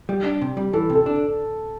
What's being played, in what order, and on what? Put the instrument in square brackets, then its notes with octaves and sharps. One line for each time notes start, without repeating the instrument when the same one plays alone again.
[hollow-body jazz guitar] G3
D4
C3
G3
[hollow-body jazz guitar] E3 [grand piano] A4
[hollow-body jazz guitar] C3
[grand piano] A4
[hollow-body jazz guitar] D4